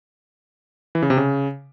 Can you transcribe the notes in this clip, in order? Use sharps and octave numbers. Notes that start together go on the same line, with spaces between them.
E3
C#3
C3
C#3